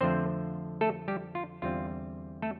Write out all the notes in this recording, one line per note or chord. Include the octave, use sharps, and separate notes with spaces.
F2 D3 F3 A3 C4 D4 C5
A3 A4
G3 G4
F4
E2 D3 G3 C4 F4
A3 A4